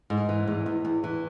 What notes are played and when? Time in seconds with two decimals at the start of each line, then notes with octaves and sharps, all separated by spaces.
0.10 G#2
0.29 E3
0.47 E2
0.66 E2
0.85 E2
1.04 E3